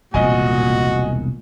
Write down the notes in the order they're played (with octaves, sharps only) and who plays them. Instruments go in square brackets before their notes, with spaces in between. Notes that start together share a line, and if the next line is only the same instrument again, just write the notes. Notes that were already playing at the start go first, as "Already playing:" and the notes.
[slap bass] E1 C2 [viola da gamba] A#2 [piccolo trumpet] F#4 [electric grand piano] D#5 G#5